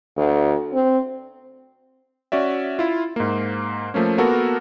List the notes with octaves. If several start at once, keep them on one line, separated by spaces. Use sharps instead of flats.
D2
C4
C#4 F#4 D5 E5
E4 F4
G#2 A#3
F3 A3 A#3 C#4
A#3 B3 F#4 A4 A#4